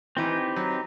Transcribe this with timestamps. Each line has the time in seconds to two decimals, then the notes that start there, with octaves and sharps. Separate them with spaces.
0.17 E3 C4 D#4 G4 B4
0.56 F#3